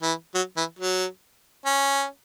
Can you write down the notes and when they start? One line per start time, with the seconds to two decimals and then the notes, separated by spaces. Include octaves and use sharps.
0.02 E3
0.35 F#3
0.57 E3
0.79 F#3
1.65 C#4